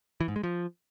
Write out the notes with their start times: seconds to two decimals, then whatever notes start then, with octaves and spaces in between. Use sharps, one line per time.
0.21 E3
0.28 G#2
0.36 G#3
0.43 F3